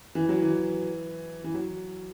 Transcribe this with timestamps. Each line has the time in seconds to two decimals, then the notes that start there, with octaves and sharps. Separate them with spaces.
0.15 E3
0.29 F#3
0.42 E3
1.44 E3
1.54 F#3